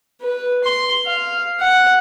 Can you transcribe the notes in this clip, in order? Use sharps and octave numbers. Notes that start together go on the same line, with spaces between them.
B4
C6
F5
F#5